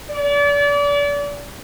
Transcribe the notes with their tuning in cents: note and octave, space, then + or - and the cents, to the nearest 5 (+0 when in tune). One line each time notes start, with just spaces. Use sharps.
D5 -35